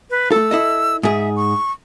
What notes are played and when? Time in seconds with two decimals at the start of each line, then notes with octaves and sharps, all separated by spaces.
0.10 B4
0.32 A3 A4 E6
0.51 E4 A4 D#5
1.03 G#2 G#4 E5
1.36 C#6